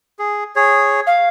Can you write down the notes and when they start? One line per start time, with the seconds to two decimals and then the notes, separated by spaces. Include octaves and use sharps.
0.19 G#4
0.56 G#4 C#5
1.06 F5